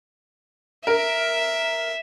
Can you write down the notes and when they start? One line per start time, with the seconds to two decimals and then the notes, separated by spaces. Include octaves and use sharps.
0.87 A#4 E5